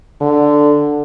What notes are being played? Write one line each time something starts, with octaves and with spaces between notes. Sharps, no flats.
D3